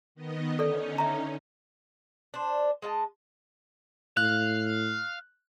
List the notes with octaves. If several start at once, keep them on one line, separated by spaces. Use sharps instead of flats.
D#3 B3 D#5
D3 C#4 D#4 A4 D5
E5 A#5
D4 C5
G#3 D#5 F5 A5
A2 F5 F#6